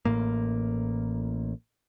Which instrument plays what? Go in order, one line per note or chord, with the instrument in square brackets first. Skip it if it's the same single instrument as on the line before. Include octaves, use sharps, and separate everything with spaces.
[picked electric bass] A1 A2 A#3